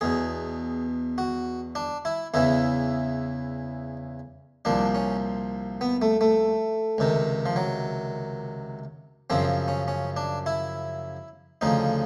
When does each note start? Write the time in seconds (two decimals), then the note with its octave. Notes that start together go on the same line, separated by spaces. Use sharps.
0.01 E2 B2 G#4
1.18 F#4
1.75 D4
2.05 E4
2.34 E2 C#3 E3 E4
4.65 C2 A#2 F3 D4
4.95 C#4
5.81 B3
6.02 A3
6.21 A3
6.98 C#2 C3 D#3
7.46 F3
7.56 F#3
9.30 F#2 C#3 F3 C4
9.68 C#4
9.88 C#4
10.16 D4
10.46 E4
11.61 D2 C#3 F3 D#4